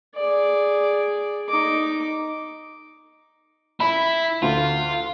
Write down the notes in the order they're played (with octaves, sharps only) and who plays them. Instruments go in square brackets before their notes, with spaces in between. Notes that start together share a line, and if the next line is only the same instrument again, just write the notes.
[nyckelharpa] G#4 D5
D#4 D6
[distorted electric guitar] E4 [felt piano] B5
[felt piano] D2 [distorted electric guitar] F4